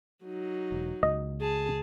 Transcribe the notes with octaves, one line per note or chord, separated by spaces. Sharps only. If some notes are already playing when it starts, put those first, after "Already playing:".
F#3 D#4
E1
C#2 D#5
G#4 A5